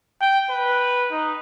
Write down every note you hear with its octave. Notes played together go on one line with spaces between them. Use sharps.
G5
B4
D#4